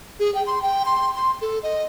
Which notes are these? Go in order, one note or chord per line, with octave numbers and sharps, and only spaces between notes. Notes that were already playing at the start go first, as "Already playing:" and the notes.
G#4
G5
C6
G5
C6
C6
A4
D#5